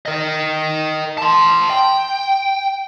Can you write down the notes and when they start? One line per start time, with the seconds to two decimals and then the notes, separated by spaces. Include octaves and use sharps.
0.06 A#4 D#5
1.18 A5 C6
1.70 G5